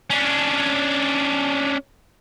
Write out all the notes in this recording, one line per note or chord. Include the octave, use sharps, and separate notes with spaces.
C#4 D4